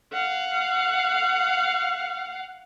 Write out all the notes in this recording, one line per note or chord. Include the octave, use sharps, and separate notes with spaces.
F5 F#5